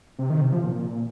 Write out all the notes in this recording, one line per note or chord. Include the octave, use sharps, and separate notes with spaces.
C3
D#3
C3
F3
A#2